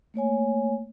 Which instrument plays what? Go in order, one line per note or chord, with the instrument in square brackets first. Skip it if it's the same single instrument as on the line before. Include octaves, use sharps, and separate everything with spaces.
[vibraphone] A3 A#3 C#5 G#5